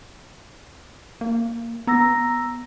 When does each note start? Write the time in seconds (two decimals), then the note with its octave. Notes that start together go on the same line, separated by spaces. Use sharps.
1.21 A#3
1.87 B3 A#5 E6 A#6